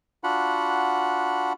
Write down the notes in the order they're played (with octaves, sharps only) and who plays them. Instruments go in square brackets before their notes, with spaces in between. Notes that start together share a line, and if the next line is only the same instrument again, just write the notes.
[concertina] D4 F4 F#4 F#5 B5